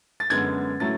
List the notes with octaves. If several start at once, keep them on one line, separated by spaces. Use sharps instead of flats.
A6
F#2 D3 G#3 B3 G#6
A2 F#3 A3 C#4 A6